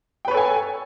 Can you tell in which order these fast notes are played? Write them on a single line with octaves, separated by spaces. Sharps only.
G5 B4 C#5 A4 G#5